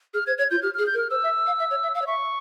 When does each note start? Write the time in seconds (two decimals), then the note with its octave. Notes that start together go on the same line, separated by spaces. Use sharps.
0.14 G#4 F6
0.27 C5 G#6
0.38 C#5 G#6
0.50 F4 G6
0.62 G4 F6
0.74 G#4 F6
0.86 G6
0.94 A#4
0.98 F6
1.10 C5 E6
1.23 E5
1.47 F5
1.59 E5
1.70 C#5
1.83 E5
1.94 F5 E6
2.02 C#5
2.07 E5 C#6